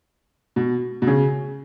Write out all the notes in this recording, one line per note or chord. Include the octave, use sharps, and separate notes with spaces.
B2
B2
C#3